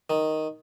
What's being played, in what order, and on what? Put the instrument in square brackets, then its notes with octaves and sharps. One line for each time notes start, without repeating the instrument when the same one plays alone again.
[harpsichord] D#3